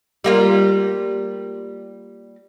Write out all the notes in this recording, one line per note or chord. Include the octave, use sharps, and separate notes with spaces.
G3 A#3 F4